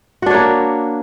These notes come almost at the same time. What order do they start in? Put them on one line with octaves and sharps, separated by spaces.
F#4 D4 C#5 A#3